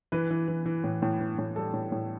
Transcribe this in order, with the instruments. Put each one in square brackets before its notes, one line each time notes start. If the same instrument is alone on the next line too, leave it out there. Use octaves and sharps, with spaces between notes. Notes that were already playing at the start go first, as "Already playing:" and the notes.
[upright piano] E3 B4
E3
E3
E3
A2
A2
E3
A2
G3 A4
A2
A2